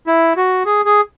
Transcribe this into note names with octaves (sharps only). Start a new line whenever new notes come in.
E4
F#4
G#4
G#4